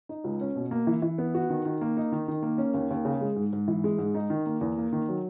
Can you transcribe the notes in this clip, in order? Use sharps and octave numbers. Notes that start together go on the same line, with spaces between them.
D#4
C#2
C#4
B2
A#3
E3
E3
B3
F#4
D#3
D#3
A#3
D#4
D#3
D#3
A#3
C#4
D#2
D#2
C#3
G#3
G#2
G#2
E3
G#3
G#2
D#4
D#3
A#3
E2
A#3
D#3
F#3